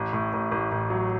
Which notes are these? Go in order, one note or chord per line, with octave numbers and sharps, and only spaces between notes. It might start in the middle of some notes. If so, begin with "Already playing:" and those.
Already playing: A1
A2
A1
A1
A1
F#3